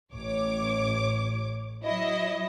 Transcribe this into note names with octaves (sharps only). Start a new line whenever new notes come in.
A1 C#5 D6
F#3 E4 D#5